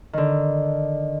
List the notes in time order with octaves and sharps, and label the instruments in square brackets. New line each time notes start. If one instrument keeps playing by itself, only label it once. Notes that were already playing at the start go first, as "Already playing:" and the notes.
[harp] D3 D#3